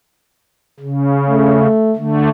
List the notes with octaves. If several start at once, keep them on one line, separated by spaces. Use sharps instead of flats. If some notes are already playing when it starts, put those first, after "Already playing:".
C#3
A3
D3 A3